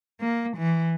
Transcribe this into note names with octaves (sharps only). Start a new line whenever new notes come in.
A#3
E3